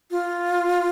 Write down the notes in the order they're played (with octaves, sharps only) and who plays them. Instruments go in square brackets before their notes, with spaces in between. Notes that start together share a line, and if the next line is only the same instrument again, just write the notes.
[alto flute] F4